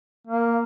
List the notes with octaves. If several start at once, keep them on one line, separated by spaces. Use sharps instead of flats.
A#3